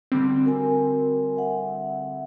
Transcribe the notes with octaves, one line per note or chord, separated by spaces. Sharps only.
D3 G3 C4
F#4 A#4 G#5
E5 F#5